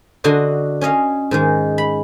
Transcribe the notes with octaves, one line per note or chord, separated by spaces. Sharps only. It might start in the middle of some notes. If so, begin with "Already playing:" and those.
D3 F#4 D#5 C6
C#4 C#5 D#5 F5
G#2 D#3 G#3
B5